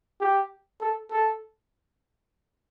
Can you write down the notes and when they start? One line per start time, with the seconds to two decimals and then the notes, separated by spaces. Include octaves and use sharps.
0.21 G4
0.81 A4
1.11 A4